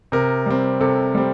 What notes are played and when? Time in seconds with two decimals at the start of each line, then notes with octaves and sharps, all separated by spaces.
0.12 C3 A#4
0.46 G3 C4
0.80 C3 A4
1.15 G3 C4